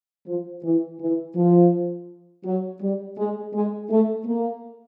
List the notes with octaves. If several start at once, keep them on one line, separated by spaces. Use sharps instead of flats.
F3
E3
E3
F3
F#3
G3
G#3
G#3
A3
A#3